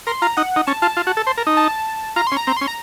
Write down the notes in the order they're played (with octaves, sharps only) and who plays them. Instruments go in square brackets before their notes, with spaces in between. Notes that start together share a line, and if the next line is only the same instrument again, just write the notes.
[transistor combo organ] A#4 [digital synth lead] C6
[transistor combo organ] F4 [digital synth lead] A#5
[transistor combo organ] D#4 [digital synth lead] F#5
[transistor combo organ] D#4
[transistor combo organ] C#4 [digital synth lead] A5
[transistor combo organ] F4 [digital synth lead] A5
[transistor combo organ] F4
F#4
A4
C5
A#4
D#4
[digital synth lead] A5
[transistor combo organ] F4 [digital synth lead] A#5
[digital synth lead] C6
[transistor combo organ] C#4
[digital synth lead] A#5
[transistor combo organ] C4 [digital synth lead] A#5
[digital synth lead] C6
[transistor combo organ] C#4
[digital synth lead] A#5